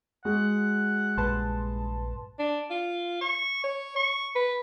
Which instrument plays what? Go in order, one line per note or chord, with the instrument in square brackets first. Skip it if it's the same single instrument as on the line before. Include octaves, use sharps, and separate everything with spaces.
[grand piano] G#3 [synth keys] F#4 [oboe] F#5
[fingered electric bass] A#1 G2 [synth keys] B4 A5 C6
[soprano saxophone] D4
F4
C#6
C#5
C#6
B4